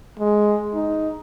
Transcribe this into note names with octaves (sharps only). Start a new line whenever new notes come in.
G#3
D#4